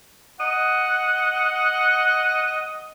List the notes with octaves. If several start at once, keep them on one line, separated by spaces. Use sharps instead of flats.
D#5 F#5